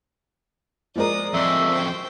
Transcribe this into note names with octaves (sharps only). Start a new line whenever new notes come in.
F3 G#3 A#4 D5 D#6
F2 F#4 D5 E5 C6
C5 G5